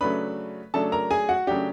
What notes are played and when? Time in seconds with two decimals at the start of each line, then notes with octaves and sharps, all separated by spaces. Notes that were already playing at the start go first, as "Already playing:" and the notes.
0.01 C#3 F#3 A3 D4 B4 B5
0.74 C#3 F#3 A3 D4 A4 A5
0.92 A#4 A#5
1.11 G#4 G#5
1.29 F#4 F#5
1.47 C#3 F#3 A3 D4 G4 G5